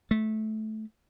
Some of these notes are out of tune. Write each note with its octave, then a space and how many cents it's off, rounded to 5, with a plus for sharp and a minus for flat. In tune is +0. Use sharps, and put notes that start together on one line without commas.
A3 -15